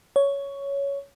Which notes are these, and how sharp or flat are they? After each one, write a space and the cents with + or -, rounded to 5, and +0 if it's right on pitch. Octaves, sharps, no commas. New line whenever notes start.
C#5 +10